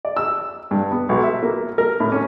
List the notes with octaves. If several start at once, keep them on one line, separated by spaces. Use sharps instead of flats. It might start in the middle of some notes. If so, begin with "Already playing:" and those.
D5
E6
G2
B3
B1
E5
A#3
A#4
A2
C#4